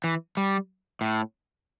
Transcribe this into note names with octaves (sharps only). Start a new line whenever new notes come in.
E3
G3
A2